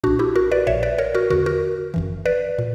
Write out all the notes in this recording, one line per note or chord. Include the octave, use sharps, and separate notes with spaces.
B1 A#2 D4 F#4
E4 G4
F#4 A#4
B4 D5
A#1 A#2 C#5 E5
B4 D5
A#4 C#5
F#4 A#4
E2 D3 F#4 A#4
F#4 A#4
G1 F#2 E3
B4 D5
A#2